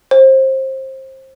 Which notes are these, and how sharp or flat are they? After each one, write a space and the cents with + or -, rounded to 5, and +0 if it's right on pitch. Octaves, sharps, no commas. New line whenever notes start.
C5 +25